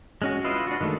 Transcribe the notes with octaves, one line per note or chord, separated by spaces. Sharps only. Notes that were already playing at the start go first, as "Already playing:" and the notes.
G#3 C#4 F#4
E4 F4 B4 D#5 F5
D4 F#4
D#3 G#3 A3 D4